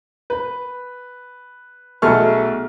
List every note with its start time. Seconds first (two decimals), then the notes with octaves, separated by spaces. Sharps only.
0.30 B4
2.02 B1 A3 G#4 A4 C#6 F6